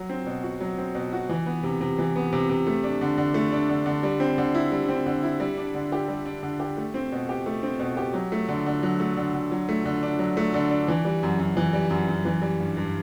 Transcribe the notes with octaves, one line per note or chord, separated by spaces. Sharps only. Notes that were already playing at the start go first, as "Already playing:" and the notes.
Already playing: F#3
C4
B2
F#4
F#3
C4
B2
F#4
E3
B3
C3
C3
E3
B3
C3
C3
A3
D4
D3
D3
A3
D4
D3
D3
G3
C4
D3
E4
G3
C4
D3
E4
G3
D4
D3
G4
G3
D4
D3
G4
A3
C4
B2
G4
A3
C4
B2
G4
F#3
A3
D3
D3
F#3
A3
D3
D3
F#3
A3
D3
D4
F#3
A3
D3
D4
E3
G3
F#2
F#2
E3
G3
F#2
F#2
E3
G3
G2
G2